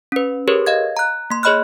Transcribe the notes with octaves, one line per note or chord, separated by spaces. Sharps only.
C#4 B4
G4 G#4 A#4 B4 C#5
D#5 F5 G#6
A#5 F#6
A#3 C6
G#4 C#5 D#5 B5 F6 F#6